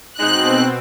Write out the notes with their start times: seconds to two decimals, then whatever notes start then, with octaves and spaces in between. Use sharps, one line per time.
0.20 B2 G#3 C4 D#4 F#6